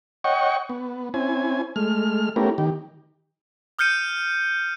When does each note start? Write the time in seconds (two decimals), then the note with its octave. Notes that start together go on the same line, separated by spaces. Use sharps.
0.24 C#5 D#5 F#5 G5 C#6
0.69 B3
1.14 C4 C#4 E4 G#5
1.76 G#3 A3 F6
2.36 A3 B3 C#4 E4 G4 A#4
2.58 D#3 G4
3.79 D#6 F6 G6 C#7 D#7